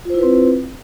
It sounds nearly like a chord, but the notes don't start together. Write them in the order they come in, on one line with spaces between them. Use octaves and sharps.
F4 C5 E4 B4 C4